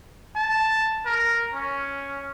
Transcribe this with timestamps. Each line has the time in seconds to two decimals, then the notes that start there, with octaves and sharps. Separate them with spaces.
0.36 A5
1.05 A#4
1.53 C#4